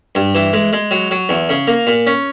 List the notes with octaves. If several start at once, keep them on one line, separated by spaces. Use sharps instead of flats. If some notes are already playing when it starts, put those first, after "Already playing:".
G2
E3
G#3
G#3
F#3
F#3
E2
C#3
A#3
A#2
C#4